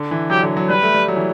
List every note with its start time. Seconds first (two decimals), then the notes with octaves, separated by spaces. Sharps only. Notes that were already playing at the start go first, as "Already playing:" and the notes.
Already playing: D3
0.11 E3
0.30 F#3 G4
0.43 D3
0.57 F#3
0.69 G3 B4
0.82 A3
0.95 G3
1.08 F#3
1.17 E3